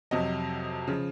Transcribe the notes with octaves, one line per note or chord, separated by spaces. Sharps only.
F2 C3 F#3 D#5
C#3 F3